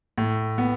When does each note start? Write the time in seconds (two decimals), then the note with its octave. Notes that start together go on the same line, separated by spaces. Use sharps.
0.18 A2
0.58 B3